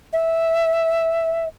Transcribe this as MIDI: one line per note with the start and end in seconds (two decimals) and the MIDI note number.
0.13 1.45 76